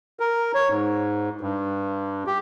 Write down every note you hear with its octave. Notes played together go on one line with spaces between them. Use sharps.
A#4
C#5
G#2
G2
G4